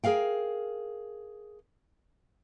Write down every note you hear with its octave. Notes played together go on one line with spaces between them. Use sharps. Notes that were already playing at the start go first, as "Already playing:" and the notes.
G#4 A#4 F5 G5